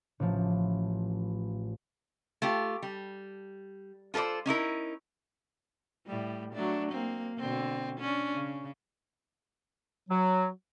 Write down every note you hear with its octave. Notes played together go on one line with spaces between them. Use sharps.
A1 F3
A3 F4 G4
G3
F4 A4 B4 C5 D5
C#4 D#4 E4 A#4
A2 G3
F#3 A3 D4
A#3 C4
B2 D3 C4
C#4 D4
C#3
F#3